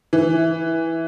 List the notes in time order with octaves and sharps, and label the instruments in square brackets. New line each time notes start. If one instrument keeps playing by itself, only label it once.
[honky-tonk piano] E3